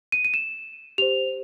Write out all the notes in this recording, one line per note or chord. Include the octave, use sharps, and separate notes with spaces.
D#7
D#7
E7
G4 C5 F7